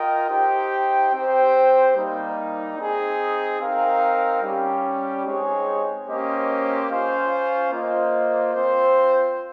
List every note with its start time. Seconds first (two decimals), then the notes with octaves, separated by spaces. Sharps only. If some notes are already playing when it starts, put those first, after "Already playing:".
Already playing: F4 A#4 D#5 G5
0.29 D#4 G4 C5 G5
1.12 C4 G4 C5 G5
1.94 G3 A#3 D#4
2.76 C4 D#4 G#4
3.59 C4 D#4 A#4 F5
4.42 G3 C#4 G4
5.24 G#3 C4 D#4 G#4 C#5
6.06 A#3 C#4 G4 C5 D#5
6.89 C#4 F4 C5 F5
7.71 A#3 F4 C5 D#5
8.53 C4 F4 C5